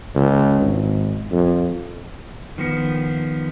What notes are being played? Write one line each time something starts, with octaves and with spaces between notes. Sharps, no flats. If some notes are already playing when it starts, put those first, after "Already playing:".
C#2
G#1
F2
D#3 F3 B3